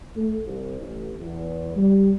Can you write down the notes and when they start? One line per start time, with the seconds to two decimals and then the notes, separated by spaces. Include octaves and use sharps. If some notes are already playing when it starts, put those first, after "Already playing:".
0.16 A3
0.47 C2
0.80 A1
1.20 E2
1.76 G3